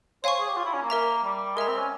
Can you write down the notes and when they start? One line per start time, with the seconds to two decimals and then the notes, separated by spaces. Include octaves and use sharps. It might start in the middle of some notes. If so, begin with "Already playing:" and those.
0.24 C5 C#5 F5 G#5 C#6
0.39 G#4
0.49 G4
0.57 F4
0.65 E4
0.73 C#4
0.82 A#3
0.90 A#4 E5 A#5
1.24 G3
1.56 G#3 A#4 E5 A#5
1.68 C4
1.79 C#4